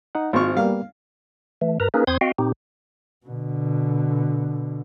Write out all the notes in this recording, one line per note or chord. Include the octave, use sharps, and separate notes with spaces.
D#4 F#5
G#1 F4 C5 C#6 F6
G3 A#3 B3 F5
E3 A3
G2 A#4 B4 A#5
A#3 C#4 D#4 G#4 A#4 B4
E2 C4 C5 C6 D#6 G#6
C4 F#4 D#5 F5 G5
A#2 C4 D#4 G4
B2 D3